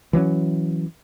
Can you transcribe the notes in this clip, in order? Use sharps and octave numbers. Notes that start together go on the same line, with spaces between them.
E3 F#3 B3 C#4